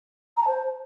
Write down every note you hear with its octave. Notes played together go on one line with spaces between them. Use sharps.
A#5
A5
C5